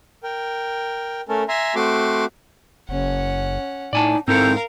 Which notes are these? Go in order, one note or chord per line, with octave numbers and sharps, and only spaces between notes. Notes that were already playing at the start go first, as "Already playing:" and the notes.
A#4 G5
A3 C#4 A4 A#4
E5 G#5 A#5 C6
A3 C4 F#4 C6 D6
F#1 C#4 F#5
A2 D#4 D5 G#5 A5
G#2 C4 E4 A4 A#4 F5 G6